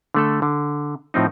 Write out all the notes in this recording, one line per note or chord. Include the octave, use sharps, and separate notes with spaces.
D3 A3 A4
D3
A2 F3 C4 D#4